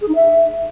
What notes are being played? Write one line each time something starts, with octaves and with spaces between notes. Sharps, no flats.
G#4
D#4
E5